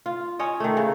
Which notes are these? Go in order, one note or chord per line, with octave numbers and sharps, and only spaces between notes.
F4
C#4 C#5 D#5
D#3 A3
C#3